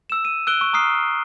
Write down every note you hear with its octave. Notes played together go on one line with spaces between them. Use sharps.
E6 E7
D#7
E6 F#6 D7 G7
C#6
A#5 D#6 F6 C7